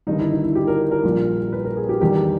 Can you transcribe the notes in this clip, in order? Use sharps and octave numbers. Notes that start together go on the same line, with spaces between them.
G1 G2 D#3 D#4
E4
D#4
E4
G4
A#4
A#4
A#1 A#2 G3
B4
A#4
G#4
G4
E2 D#3 G3 G4